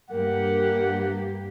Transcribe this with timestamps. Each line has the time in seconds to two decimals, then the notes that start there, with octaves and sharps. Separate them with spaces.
0.10 G2 A#3 G4 A#4 F#5